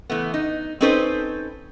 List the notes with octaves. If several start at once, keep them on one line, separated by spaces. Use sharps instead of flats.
E3 A3 B3
D#4
C4 C#4 D#4 A4 B4 C5